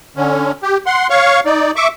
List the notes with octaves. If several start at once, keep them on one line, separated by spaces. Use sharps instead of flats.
D3 C#4
G4
F#5 C6
C#5 F5 C#6
D#4 D5
E5 C#6 D6